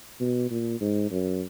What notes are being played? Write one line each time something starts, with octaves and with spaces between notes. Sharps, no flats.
B2
A#2
G#2
F#2